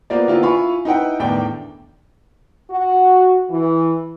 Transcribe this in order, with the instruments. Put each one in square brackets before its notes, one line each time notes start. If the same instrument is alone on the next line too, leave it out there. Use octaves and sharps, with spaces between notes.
[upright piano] A#3 B3 F4 C5 D5
D#3 A#3 B3 D4 E4 F4
E4 F4 F5 G#5 B5 C#6
D#4 E4 B4 F#5 G5
E2 A2 D#3 D4 B4 G5
[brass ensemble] F#4
E3